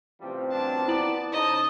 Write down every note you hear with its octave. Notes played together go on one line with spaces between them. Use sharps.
A1 C3 F3 G3 C4
F#2 D4 A5
B3 E4 D5 F#7
C#3 D#4 C5 D#5 A5